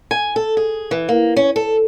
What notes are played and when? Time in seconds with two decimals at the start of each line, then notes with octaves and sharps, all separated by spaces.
0.11 G#5
0.36 A4
0.57 G#4
0.91 E3
1.09 A#3
1.36 C#4
1.56 A4